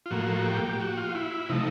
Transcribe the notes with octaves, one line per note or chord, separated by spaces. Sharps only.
F4
A2 F3 A#3 F#4
G4
F#4
F4
E4
C3 F3 A3 D#4